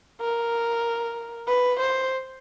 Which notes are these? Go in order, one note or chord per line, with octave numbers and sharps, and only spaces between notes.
A#4
B4
C5